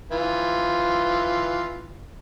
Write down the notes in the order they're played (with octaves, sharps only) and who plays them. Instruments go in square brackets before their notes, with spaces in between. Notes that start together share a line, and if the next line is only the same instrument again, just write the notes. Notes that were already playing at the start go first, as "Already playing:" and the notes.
[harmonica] E3 F4